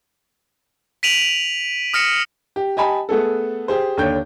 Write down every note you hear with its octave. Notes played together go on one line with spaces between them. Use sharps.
B6 D7 D#7 F7 F#7
D#6 F6 A#6 C#7 E7
G4
G4 D#5 G#5 A5 B5
A3 B3 G#4 A4
G4 G#4 C5
D#2 D3 C#5 G5 G6